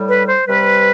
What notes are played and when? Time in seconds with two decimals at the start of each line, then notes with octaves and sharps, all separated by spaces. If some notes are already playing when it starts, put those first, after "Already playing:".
Already playing: A2 G3
0.08 B4
0.28 C5
0.47 C3 G3 B4